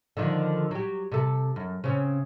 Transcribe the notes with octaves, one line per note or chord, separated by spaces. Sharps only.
D3 D#3 F3
F#3 G4
C3 A4
F#2
C#3 C4 C#4